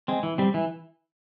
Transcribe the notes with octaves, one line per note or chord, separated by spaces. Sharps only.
G#3 C4
E3
G3 C4
E3